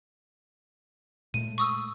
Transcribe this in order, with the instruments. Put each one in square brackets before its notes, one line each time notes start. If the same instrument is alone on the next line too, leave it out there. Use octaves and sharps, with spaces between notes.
[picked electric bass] A#2 G#3 A3 [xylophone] D#7
[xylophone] C#6 D#6 E6